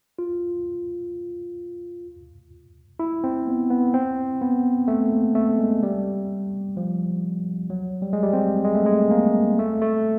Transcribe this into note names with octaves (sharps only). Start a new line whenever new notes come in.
F4
E4
C4
B3
B3
C4
B3
A3
A#3
A3
G#3
G3
F3
F#3
G3
G#3
G3
C4
G#3
A3
G#3
A#3
A3
A3